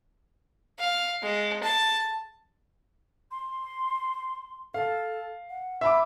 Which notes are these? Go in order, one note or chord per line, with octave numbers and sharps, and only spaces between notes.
F5
G#3
A5
C6
A4 F5
F#5
E5 B5 D6